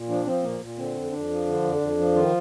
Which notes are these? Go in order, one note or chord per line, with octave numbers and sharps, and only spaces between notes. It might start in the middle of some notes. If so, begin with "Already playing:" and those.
Already playing: A#2
F3 D4
F3 C4
A#2 A#3
A#2
D3 C4
F2
F2 D4
F3
D3
F2
F2
F3
D#3 F4